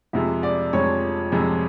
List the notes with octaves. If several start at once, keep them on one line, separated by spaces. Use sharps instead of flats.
F2 C3 F3 G#3 E5
D5
F2 C3 F3 G#3 C#5
F2 C3 F3 G#3